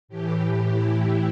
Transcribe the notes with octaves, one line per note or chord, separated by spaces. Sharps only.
A2 E3 G4
E4